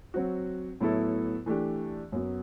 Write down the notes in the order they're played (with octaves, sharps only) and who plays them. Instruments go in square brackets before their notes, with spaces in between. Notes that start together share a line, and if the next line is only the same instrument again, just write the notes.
[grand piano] F#3 C4 F#4
A2 F#3 B3 E4 A4
E3 A3 D4 G4
F#2 F#3 B3 F#4